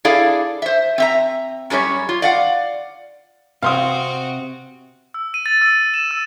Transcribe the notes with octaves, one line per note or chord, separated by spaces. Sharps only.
D4 E4 G#4 A4 D5 F5
C5 E5
C4 E5 A#5
F#2 G3 C#4 G4 C#5
F4
D5 F5 F#5
C3 C4 F#4 F5 C6 D#6
E6
D#7
A6
E6
A6
E7
E6